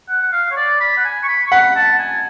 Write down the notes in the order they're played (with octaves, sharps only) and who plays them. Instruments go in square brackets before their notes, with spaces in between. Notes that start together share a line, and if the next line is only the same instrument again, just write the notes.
[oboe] F#5
F#5
F5
C#5
D5
B5
F#5
G#5
C#6
B5
C#6
[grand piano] F#5 [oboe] B5
[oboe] A5
G#5